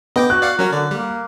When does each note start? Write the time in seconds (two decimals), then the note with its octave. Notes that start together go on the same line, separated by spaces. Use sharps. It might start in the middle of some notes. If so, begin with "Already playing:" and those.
0.16 B3 D#5 G5 D6
0.30 F#4 F#6
0.42 D5 F5 F#5
0.59 F#3 C#4 F#4 A#4
0.72 D3 D5
0.91 G3 A#3